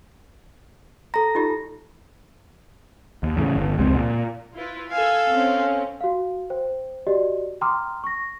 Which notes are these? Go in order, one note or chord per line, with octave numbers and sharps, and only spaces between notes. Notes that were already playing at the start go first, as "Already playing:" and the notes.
A4 A#5 A#6
D#4 F4 G4
D#2
E2 A2 C#3
G1
F1 C#2 G#3 C4
A#2
E4 F4 B4
A4 F5 G#5 E6
C4 C#4
F#4 F5
C5 G5
F#4 G4 D5 D#5
G5 A#5 C6 D6 D#6 F6
C#6 A#6